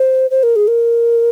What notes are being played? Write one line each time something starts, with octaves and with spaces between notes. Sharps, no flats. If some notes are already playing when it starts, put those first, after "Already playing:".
Already playing: C5
C5
A#4
G#4
A#4